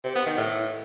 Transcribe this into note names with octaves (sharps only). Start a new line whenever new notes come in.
C3
B3
D#3
A2